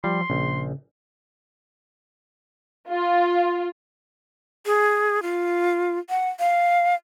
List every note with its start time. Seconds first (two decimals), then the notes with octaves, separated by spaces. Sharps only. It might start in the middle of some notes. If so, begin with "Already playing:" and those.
0.04 F3 G3 C6
0.30 A#1 C#3
2.89 F4
4.66 G#4
5.22 F4
6.10 F#5
6.40 F5